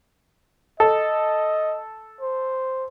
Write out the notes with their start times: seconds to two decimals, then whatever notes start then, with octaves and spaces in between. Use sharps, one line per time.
0.80 A4 D#5
2.21 C5